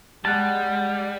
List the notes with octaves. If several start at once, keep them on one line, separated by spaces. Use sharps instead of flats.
G3 G#3 F#5 A5